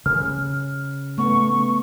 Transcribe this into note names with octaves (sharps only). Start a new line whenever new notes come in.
C#3 F6
A3 B3 C#6